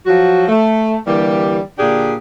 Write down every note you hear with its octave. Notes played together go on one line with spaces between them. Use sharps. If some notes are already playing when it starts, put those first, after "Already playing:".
F3 F#3 F#4
A3
D3 E3 G3 A#3 G4
A#2 D3 D4 G4 G#4